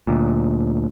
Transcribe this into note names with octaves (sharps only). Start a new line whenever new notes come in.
D2 A#2